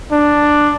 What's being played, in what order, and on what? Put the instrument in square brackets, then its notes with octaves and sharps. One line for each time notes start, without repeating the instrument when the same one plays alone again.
[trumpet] D4